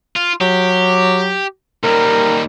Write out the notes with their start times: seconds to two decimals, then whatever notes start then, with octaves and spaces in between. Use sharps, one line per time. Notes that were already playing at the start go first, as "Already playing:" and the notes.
0.16 F4
0.41 F#3 G4
1.83 D#2 G3 A#4